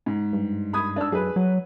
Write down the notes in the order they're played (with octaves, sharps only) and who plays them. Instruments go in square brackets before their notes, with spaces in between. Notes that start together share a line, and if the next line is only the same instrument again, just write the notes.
[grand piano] G#2
[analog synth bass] G2
[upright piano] B5 D#6 G#6
D4 E6
[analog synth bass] F#2 [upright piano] G#4 B4
[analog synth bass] F#3